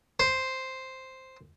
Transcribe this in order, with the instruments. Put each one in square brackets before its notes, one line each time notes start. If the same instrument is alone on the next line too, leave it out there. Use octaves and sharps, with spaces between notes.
[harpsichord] C5